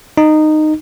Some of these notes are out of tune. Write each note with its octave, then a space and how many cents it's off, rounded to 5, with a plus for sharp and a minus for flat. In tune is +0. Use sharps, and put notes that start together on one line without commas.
D#4 -15